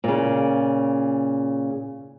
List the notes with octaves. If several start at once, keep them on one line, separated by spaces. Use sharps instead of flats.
A#2 C#3